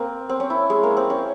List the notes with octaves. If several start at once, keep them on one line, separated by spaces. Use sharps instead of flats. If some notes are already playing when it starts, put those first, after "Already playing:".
Already playing: A#3 C4
C4
C#4
E4
G#3
A#3
C4
C#4